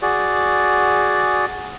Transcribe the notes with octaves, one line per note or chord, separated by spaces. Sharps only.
F#4 G#4 D5